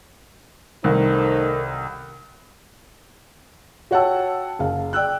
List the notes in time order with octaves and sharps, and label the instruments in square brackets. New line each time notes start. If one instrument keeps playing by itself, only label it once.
[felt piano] C2 D#3 [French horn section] A3 D#4 C5 [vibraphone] A#4
[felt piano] F#4 C#5 F#5 G5 A5 E6
F#1 F5
D5 G5 E6 F#6